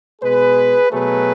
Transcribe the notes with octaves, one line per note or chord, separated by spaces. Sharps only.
B2 G#3 G#4 B4
B2 F#3 A3 G#4 B4